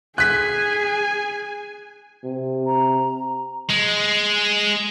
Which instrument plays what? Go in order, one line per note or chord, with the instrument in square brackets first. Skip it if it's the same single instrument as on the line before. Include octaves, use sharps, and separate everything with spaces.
[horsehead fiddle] G#4 [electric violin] G#5 [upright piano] F#6 B6
[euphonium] C3
[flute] A#5
[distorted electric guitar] G#3